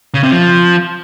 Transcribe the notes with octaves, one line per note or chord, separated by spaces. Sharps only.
C#3
C3
F3